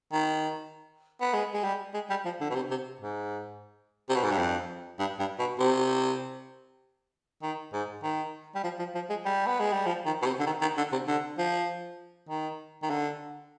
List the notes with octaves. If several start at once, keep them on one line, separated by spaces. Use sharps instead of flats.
D#3
B3
G#3
G#3
G3
G#3
G3
F3
D3
B2
C3
C3
G#2
C3
B2
G#2
G2
F2
G2
G2
B2
C3
D#3
G#2
D#3
G3
F3
F3
F3
G#3
G3
B3
G#3
G3
F3
D#3
B2
C3
D3
D#3
D#3
D3
C3
D3
F3
D#3
D#3
D3